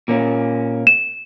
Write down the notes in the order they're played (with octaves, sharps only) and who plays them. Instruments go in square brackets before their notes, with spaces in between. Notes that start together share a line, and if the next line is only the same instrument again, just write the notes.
[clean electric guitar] A#2 A#3 C#4
[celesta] E7